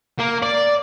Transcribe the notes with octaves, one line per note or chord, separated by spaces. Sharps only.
A#3
D5